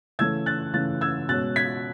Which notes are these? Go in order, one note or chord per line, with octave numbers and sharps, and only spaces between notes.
C#3 E3 A3 C#4 E6 G#6
F#6 A6
C#3 E3 A3 C#4 F#6 A6
E6 G#6
B2 G#3 C#4 F#6 A6
G#6 B6